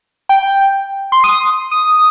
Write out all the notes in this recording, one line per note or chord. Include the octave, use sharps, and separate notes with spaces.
G5
C6
D#6
D#6